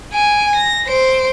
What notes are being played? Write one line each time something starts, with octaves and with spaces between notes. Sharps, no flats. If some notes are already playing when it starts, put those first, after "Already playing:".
G#5 D7
A#6
C5 D7